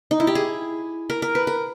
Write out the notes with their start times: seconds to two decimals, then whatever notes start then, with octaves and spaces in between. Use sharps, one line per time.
0.11 D#4
0.20 E4
0.27 G4
0.35 G#4
1.10 A#4
1.22 A#4
1.35 B4
1.47 A#4